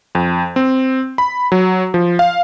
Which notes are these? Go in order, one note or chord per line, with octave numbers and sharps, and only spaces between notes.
F2
C4
B5
F#3
F3
F5